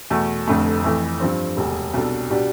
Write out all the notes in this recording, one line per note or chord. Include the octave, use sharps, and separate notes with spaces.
E2 B2 A3
F1 F2 D3 A3
F2 E3 A3
G2 F3 C4
E1 D2 C3
C2 B2 B3 D4 A4
B2 G3 D4 G4